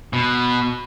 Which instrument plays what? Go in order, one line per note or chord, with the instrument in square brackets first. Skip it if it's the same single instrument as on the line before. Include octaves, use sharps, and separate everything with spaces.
[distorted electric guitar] B2